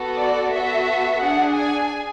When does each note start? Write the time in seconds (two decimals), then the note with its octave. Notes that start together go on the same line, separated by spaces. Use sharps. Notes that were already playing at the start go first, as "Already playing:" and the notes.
Already playing: B3 F#4 A4
0.17 D5
0.51 B3 F#4 A4 E5
1.21 D4 G#4 F#5
1.55 G#5